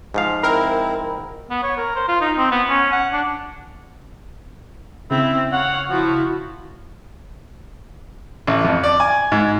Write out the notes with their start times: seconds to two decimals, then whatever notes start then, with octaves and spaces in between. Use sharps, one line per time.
0.14 G#2 F3 F5
0.43 C4 E4 A#4
1.50 B3
1.62 C#5
1.77 A#4
1.95 C5
2.08 F4
2.21 D#4
2.37 C4
2.51 B3
2.69 C#4
2.92 F#5
3.13 D4
5.11 C#3 C4 E4
5.52 C#5 F5 F#5
5.90 F3 E4 F#4
8.47 A1
8.64 F2
8.84 D5
9.00 G#5
9.32 G#2